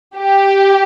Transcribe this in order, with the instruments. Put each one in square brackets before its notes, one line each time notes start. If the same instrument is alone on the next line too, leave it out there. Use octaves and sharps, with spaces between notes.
[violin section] G4